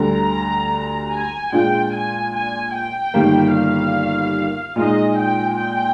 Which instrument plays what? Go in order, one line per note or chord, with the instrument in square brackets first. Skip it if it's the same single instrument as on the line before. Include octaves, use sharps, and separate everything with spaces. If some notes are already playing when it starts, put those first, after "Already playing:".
Already playing: [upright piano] D2 D3 G3 [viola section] A#5
[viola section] G#5
[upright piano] A#2 G#3 D4 F4 [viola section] G5
[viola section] G#5
G#5
G5
[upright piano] G1 G2 D#3 G3 A#3
[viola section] F5
[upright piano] A#2 G#3 D#4 [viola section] D#5
[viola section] G5
G5